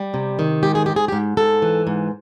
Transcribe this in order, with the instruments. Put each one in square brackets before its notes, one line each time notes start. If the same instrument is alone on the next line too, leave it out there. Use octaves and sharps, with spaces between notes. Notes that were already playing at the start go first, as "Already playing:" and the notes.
Already playing: [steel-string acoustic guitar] G3
C3
D#3
G#2 G4
G#4
G#2 G4
G#4
G4
G#2
G#2 A4
E3
G#2